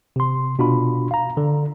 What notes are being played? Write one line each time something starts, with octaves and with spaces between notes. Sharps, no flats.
C3 C6
B2 D4 F4 F#4 B5
F5 A#5
D3